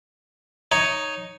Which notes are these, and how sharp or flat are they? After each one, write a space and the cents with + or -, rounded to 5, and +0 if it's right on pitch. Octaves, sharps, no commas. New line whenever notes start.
D#4 +0 C#5 +5